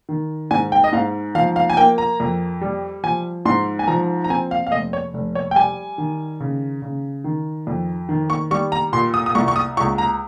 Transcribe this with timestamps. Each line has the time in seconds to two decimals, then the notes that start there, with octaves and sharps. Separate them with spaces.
0.09 D#3
0.51 G#2 G#5
0.72 G5
0.84 D#5
0.93 G#2 F5
1.35 F3 F5
1.56 F5
1.70 G#5
1.77 A#3 G5
1.98 A#5
2.20 F2
2.61 G3
3.04 F3 G#5
3.45 G#2 C6
3.79 G#5
3.88 F3 A#5
4.24 A#5
4.30 C4 G#5
4.51 F5
4.67 F5
4.72 F1 D#5
4.93 C#5
5.14 F1
5.35 C#5
5.51 G5
5.56 G3 G#5
5.98 D#3
6.40 C#3
6.82 C#3
7.24 D#3
7.67 F2
8.09 D#3
8.30 C#6
8.51 G3 C#6
8.72 A#5
8.93 A#2 C6
9.14 D#6
9.26 D#6
9.35 C2 C#6
9.48 C#6
9.56 D#6
9.77 C#2 C#6
9.98 A#5